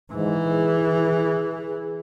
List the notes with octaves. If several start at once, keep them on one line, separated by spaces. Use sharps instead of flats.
G#2 E3
G#4